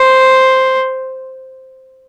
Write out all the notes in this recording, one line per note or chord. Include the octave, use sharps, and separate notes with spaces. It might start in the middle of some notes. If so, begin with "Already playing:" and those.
Already playing: C5